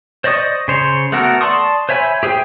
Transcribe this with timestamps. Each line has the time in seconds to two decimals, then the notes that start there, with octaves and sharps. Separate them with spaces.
0.24 C5 D5 D#5 C#6 D#6
0.68 C#3 C5 C#5
1.12 A3 B3 F#4 A4 A#4
1.41 D5 A5 C6 C#6 D#6
1.89 C5 C#5 E5 G#5 B5
2.23 G4 G#4 C5 E5 G5